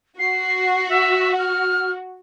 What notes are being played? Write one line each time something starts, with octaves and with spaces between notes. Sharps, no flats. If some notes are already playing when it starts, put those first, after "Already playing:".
F#4 C7
E5
F6